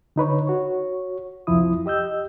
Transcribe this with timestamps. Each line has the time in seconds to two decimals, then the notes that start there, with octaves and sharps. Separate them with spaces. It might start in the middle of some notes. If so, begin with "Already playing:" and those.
0.16 D3 D#4 B4 C#5
0.47 F#4 C#5
1.47 C2 F2 F3 E4 D#6
1.86 G4 D#5 E6 G6